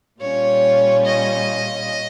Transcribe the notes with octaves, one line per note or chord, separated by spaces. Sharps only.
A#2 G3 C#4 F4 C#5
D#5